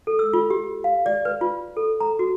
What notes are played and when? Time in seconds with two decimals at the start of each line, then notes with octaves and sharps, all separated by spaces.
0.07 A4
0.19 E6
0.33 F4
0.50 G4
0.84 F5
1.06 D5
1.25 B4
1.41 F4
1.77 A4
2.00 A#5
2.19 F#4